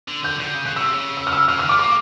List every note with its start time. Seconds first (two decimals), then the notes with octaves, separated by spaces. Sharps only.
0.08 D3
0.24 D3 G6
0.40 D3 G6
0.55 C#3
0.66 C#3 F#6
0.76 C#3 E6
0.84 C3
0.93 C#3
1.17 E6
1.27 F6
1.33 E6
1.48 C#3 F6
1.59 D#3 F6
1.69 A3 D6
1.79 A#3 D6